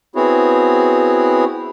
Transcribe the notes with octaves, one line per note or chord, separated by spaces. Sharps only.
B3 C4 E4 F#4 G#4 C#5